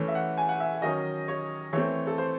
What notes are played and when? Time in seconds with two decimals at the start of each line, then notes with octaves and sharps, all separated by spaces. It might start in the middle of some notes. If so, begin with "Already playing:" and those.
Already playing: E3 A3 C#4
0.08 E5
0.15 F#5
0.38 G#5
0.49 F#5
0.60 E5
0.82 D#3 F#3 C#4 D#5
1.28 C#5
1.73 E3 A3 C4 C#5
2.07 A4
2.18 C5